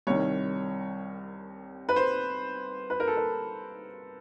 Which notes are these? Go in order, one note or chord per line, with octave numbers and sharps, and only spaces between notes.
C2 C3 D#3 C#5
B4
C5
B4
A#4
A4
A#4